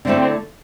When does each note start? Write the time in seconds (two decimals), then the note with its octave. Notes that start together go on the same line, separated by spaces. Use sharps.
0.05 D3 A3 C4 E4 A4
0.16 C4